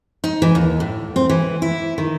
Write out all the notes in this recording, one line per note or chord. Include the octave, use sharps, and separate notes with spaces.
D#4
E3
D#2
A2
C4
E3
E4
D#3